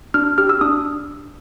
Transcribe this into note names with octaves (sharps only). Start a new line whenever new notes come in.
D4 F6
G4 F6
E6
D4 D#6